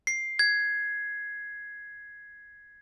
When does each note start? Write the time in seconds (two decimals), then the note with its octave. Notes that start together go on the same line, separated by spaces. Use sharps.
0.07 C7
0.39 G#6